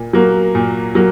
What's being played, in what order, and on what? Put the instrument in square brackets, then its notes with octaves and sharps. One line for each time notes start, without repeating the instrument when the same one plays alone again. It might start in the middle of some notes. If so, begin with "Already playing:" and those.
Already playing: [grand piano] A#2
F#3 A#3
A#2
F#3 A#3